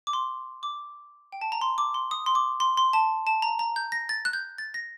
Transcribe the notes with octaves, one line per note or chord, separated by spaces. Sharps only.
D6
C6
D6
G5
A5
A#5
C6
D6
C6
D#6
C6
D6
C6
C6
A5
A5
A#5
A#5
G6
A#6
A6
F#6
G6
A6
A#6